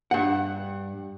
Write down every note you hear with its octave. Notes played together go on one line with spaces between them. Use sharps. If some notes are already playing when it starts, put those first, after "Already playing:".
G2 F#5